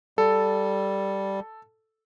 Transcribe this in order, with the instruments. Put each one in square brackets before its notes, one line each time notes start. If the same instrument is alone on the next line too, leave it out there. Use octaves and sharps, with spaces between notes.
[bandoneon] G3 [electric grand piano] A4